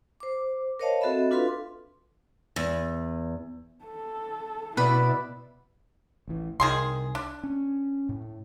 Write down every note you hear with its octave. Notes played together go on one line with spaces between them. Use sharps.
C5 D6
A#4 C5 C#5 D#5 F5 A5
C4 F#4 A4 D#5 E5 B5
D4 F4 A4 B4 F5 C6
E2
A4
B2 E4 B4 D5
A1 E3
C2 D#3 G#4 C6
D4
C#4
A2